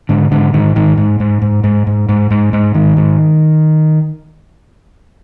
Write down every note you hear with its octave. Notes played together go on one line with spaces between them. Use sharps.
G#2 D3
G#2 D3
G#2 D#3
G#2 D#3
G#2
G#2
G#2
G#2
G#2
G#2
G#2
G#2
G#2 D#3
G#2